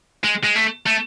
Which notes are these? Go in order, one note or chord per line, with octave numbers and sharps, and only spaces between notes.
G#3
G#3
A3
A3